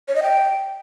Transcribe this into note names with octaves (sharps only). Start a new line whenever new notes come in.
C#5
D#5
G5